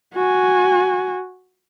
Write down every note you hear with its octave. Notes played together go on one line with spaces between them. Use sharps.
F#4 G#5